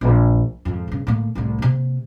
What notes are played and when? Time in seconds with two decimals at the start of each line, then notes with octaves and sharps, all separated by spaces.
0.01 A#1 F#2
0.65 F2 G#2
0.88 G2 C#3
1.07 A2 A#3
1.35 C2 A2
1.58 C3 A#3